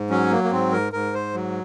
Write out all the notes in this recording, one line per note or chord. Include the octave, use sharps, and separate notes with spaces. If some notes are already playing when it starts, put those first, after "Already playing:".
Already playing: G#2
F#3 C#4
A#3
A#3
G#2 C4
A#4
G#2 A#4
C5
F#3